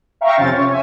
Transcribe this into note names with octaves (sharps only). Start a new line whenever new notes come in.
E5 F5 G5 A#5 C#6
F2 C3 C#4 F4 A6
C#5
E5 G#5